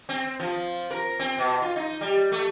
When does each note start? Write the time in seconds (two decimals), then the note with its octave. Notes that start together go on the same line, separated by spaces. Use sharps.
0.09 C4
0.40 F3
0.91 A#4
1.19 C4
1.39 B2
1.62 F4
1.76 D#4
2.01 G3
2.32 A3